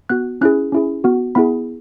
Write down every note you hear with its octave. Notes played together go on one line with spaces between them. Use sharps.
B3 F#4 F#6
C#4 E4 G#4 F#6
C#4 E4 G#4
B3 F#4
B3 E4 G#4 B5